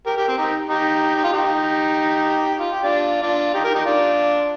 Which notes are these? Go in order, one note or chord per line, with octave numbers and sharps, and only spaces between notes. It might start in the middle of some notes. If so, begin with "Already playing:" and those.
G4 A#4
G4 A#4
C4
D#4 G4
D#4 G4
D#4
F4
D#4 G4
F4
G4
D4 F4
D4 F4
D#4 G4
G4 A#4
D#4 G4
D4 F4